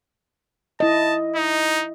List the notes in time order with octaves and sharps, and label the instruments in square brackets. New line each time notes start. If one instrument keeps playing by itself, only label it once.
[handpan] E4 D#5 [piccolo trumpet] A5
[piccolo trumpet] D#4